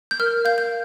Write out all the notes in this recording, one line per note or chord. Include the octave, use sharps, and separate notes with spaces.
G6
A#4 F6
F5 G6
G6